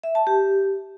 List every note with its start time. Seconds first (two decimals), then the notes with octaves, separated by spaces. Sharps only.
0.04 E5
0.15 A5
0.27 G4